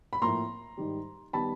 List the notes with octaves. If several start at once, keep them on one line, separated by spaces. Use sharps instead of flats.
B5
A2 F3 A#3 A#5 C6
G#2 D#3 G3
D#3 G3 B3 A5 B5